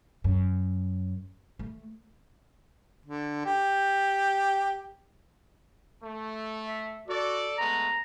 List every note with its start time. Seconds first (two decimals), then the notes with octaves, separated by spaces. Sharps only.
0.24 F#2
1.59 A3
3.06 D3
3.46 G4
6.02 A3
6.66 E5
7.08 F#4 A4 D5
7.58 G#3 A3 B3 A#5